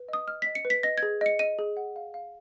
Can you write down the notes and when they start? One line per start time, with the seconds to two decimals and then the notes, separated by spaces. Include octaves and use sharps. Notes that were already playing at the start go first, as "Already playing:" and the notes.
Already playing: B4
0.09 D#5 D#6
0.27 D#5 F6
0.42 D#5 B6
0.55 C#7
0.65 B4
0.70 B6
0.83 D#5 A#6
0.98 G#6
1.03 G#4
1.21 D#5 C#7
1.39 D#5 D#7
1.59 G#4
1.77 F#5
1.96 F5
2.14 F5